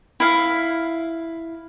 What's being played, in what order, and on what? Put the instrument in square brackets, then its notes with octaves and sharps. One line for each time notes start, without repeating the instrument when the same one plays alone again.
[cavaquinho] E4 F5